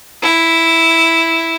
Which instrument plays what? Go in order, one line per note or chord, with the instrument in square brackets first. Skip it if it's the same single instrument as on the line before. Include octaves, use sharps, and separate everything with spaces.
[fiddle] E4